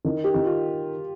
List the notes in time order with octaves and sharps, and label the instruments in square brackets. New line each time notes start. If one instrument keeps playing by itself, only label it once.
[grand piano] D#3
[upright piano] G4
[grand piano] D#3
[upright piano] F4